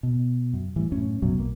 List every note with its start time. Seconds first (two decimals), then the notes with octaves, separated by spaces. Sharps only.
0.03 B2
0.53 F#2
0.76 A2 E3 G3
0.92 F#2 A2 C#4
1.22 C2 F#2 B2 F#3
1.38 B1 A#3